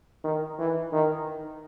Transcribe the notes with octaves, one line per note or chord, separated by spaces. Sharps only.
D#3
E3
D#3